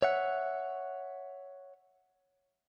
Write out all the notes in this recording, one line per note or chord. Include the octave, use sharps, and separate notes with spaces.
C#5 E5 F#5